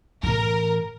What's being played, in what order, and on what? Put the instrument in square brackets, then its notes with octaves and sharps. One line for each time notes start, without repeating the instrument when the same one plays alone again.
[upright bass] A2 E3 [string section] A#4